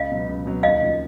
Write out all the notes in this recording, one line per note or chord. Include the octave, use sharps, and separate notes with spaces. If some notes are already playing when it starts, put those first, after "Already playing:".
Already playing: C#2 D#5 F5
B2 F#3 B3
C#2
B2 F#3 B3
D#2 D#5 F5
C#3 F3